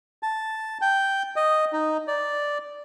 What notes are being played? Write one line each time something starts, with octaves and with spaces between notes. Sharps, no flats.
A5
G5
D#5
D#4
D5